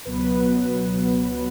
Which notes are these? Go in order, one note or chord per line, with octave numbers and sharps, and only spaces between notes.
C#2 B2 F#3 B3 B4